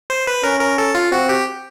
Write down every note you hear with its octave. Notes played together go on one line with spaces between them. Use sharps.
C5
B4
C#4 A#4
A#4
A4
F4
C4 F#4
G4